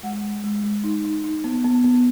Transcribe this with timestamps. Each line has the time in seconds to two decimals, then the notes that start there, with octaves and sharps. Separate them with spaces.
0.03 G#3 F#5
0.23 G#3
0.44 G#3
0.64 G#3
0.84 D#4
1.04 D#4
1.24 D#4
1.44 B3
1.64 B3
1.84 B3